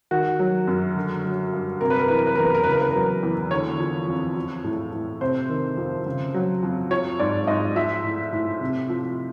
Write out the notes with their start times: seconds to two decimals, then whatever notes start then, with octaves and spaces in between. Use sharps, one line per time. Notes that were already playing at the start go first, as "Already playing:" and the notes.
0.11 D#3 F#4
0.39 F#3
0.67 F#2
0.96 D3
1.25 F#3
1.53 G2
1.81 C3 A#4
1.90 B4
1.99 A#4
2.08 E3 B4
2.17 A#4
2.27 B4
2.35 E2 A#4
2.45 B4
2.55 A#4
2.64 C#3 B4
2.72 A#4
2.81 B4
2.91 F#3 A#4
3.23 E2
3.51 D3 C#5
3.80 F3
4.08 F2
4.36 F3
4.64 A2
4.92 A2
5.21 C3 C5
5.49 D#3
5.77 F2
6.06 C#3
6.34 F#3
6.63 F2
6.90 F3 C#5
7.19 G#2 D5
7.47 G#2 D#5
7.76 F3 E5
8.04 A2
8.33 A2
8.61 C3
8.89 F3